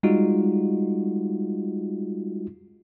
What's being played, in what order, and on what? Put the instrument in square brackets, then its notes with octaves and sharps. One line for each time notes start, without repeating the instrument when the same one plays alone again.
[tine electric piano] G3 G#3 D#4 F4 F#4